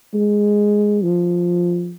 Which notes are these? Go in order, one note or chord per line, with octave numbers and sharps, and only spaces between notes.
G#3
F3